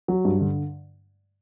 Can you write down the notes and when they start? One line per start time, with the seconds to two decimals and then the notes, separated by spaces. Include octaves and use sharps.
0.08 F#3
0.25 G2
0.41 D3